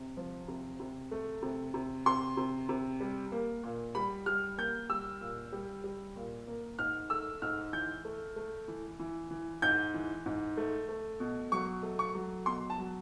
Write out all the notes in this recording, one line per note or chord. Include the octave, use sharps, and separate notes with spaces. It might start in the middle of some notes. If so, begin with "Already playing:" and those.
Already playing: C3
F3
C3
C3
A3
C3
C3
C3 C6
C3
C3
G3
A#3
A#2
G3 B5
G3 F6
A#3 G6
G3 E6
A#2
G3
G3
A#2
A#3
G#2 F6
A3 E6
G#2 F6
E3 G6
A3
A3
E3
E3
E3
G#2 G6
E3
G#2
A3
A3
B2
F#3 C#6
A3
C#6
F#3
B2 C6
A5
F#3